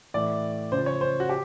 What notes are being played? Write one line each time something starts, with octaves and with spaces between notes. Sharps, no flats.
A2 E3 D5
C#3 F3 C5
C#5
C5
F#4
G4